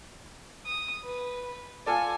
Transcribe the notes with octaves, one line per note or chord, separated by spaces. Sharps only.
D#6
B4
F4 A4 D5 G#5